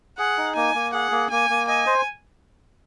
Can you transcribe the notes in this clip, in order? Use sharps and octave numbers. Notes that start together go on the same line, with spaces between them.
G#4 F#5
D#4
A#3 G#5
A#3
G#4 F#5
A#3
A#3 G#5
A#3
D#5 G#5
C5